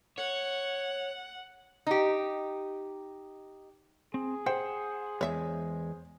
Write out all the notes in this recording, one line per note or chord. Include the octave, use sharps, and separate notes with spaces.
C#5 F#5
D#4 G4
C4 G#4
C5 F#5 G5
E2 G#3 C#5 E5